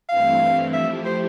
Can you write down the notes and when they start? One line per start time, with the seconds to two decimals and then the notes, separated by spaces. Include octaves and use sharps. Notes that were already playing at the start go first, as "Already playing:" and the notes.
0.09 G2 E3 A3 C4 E4 F5
0.73 F3 A3 E4 G4 E5
1.06 C5